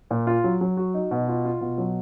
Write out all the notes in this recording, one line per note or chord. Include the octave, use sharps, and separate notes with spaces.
A#2
F4
F#3
F#3
F#4
D#4
B2
F4
F4
B2
F#3